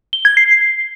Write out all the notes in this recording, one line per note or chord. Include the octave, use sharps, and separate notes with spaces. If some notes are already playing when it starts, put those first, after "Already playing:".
G7
G#6
C7